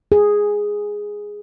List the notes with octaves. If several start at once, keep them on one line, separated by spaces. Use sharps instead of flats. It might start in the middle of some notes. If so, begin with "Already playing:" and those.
G#4